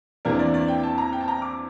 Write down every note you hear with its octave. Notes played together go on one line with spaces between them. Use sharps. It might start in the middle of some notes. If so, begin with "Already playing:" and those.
E2 C3 E3 A#3 D4 A#4
D5
D5
G5
A5
A#5
G5
A5
A#5
D6